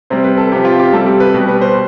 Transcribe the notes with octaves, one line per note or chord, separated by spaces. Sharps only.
C3 G3 C5
B4
A4
C3 F3 G4
F4
G4
C3 G3 A4
G4
B4
B2 G3 G4
B4
C5